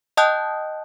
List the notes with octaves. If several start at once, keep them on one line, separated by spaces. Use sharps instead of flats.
D#5 G5 A5 D#6 F#6 G6